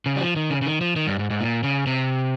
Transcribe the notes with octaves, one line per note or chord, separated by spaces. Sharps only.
C#3
G3
F3
D#3
C#3
C#3
D#3
F3
D#3
G2
G#2
G#2
A#2
C#3
C3